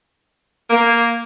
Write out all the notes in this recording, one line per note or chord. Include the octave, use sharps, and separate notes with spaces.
A#3